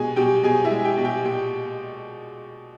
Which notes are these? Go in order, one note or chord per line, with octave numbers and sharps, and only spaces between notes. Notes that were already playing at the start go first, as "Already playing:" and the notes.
Already playing: B2 G#3 G4 G#4 G#5
B2 G4 G5
B2 G#4 G#5
E4 E5
G#3
G4 G5
B2
G4 G5
A#2 G4 G5